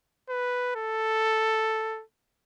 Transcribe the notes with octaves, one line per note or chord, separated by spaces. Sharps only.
B4
A4